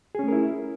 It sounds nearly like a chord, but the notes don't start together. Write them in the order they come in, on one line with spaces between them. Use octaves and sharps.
G#4 C#4 A3 A#4 E4